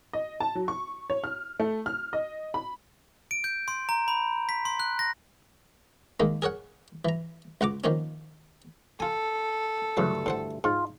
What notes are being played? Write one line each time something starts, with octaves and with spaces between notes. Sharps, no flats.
D#5
A5
F#3
C#6
C#5
F6
A3
F6
D#5
B5
D7
G6
C6
A#5
B5
B6
C6
F#6
A#6
D#3 G#3 A#3
G#4 A#4 C#5 F#5
E3 A#5
C#2 F#5 A#5 D6
D#3 F3 A#3 C#4
F4 A4 G#5
D2 G2 C#3 E3 F#3 A3
A2 C5 F#5
G#2 F4